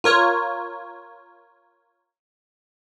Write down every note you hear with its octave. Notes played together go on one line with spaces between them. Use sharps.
F4 A#4 C#5